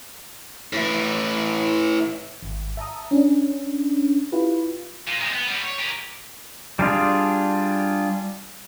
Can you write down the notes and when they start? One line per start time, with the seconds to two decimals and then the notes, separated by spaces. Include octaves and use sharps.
0.73 A2 E3
2.42 G#1
2.77 E5 A5 A#5 D#6
3.11 C#4 D4
4.32 E4 F4 G4 B4
5.07 A#2
5.20 G#3 C4
5.33 B3
5.48 G3 B3
5.63 C#5
5.79 G4 A#4
6.79 G3 D4 F4 G#4